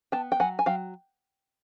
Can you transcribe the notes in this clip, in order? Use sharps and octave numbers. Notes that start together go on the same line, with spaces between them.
B3 G5 A5
G5
F#3 F#5 G#5
G#5
F#3 F5 G5